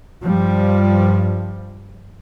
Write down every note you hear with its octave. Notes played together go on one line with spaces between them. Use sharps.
G2 F3 G3